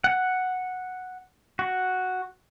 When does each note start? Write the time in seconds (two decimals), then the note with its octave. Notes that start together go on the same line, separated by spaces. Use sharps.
0.04 F#5
1.59 F#4